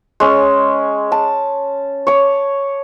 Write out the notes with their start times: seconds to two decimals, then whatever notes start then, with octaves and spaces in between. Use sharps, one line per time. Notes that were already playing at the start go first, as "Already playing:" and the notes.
0.20 G#3 C#4
1.12 A5
2.07 C#5 D6